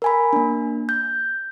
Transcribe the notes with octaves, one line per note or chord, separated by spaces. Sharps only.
A#4 G#5 B5
A#3 D4
G6